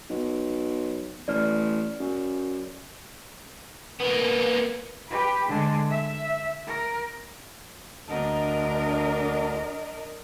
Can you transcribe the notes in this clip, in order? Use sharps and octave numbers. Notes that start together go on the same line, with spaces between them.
B1
A1 D5 F6
F#2
A#3 B3
G4 B4
D3 G#3
E5
A#4
D2 D3 D4 A#4 D#5